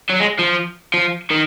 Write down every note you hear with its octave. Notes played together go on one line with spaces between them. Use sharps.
F#3
G#3
F3
F3
D#3